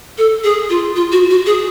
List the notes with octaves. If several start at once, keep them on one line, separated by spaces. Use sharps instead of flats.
A4
G#4
F4
F4
F#4
F#4
G#4